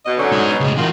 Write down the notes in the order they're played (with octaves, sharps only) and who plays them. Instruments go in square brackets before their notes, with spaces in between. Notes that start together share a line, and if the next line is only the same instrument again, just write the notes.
[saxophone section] B2 [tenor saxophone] D#5
[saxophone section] G#2 F#3 C#4 [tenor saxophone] D3
[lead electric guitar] G#3 D#4
[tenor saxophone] B2
[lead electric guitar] C#2 A2 [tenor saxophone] G#3
[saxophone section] D#3 [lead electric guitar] E3 F#4 [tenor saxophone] F4